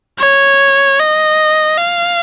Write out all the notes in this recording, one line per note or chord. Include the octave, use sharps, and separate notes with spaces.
C#5
D#5
F5